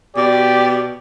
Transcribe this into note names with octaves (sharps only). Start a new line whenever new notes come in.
B2 G4 D5